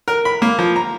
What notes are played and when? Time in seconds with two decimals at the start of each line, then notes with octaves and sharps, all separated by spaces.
0.08 A#4
0.25 B5
0.42 A#3
0.59 F3
0.76 A#5